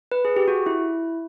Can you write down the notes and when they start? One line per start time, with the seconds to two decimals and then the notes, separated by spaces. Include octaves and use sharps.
0.12 B4
0.25 G#4
0.36 G4
0.48 F#4
0.66 E4